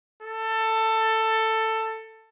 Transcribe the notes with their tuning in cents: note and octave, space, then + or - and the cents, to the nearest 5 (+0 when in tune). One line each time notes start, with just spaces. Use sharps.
A4 +15